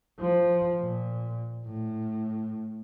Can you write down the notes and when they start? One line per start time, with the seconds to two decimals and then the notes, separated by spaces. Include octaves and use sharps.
0.20 F3
0.81 A#2
1.65 A2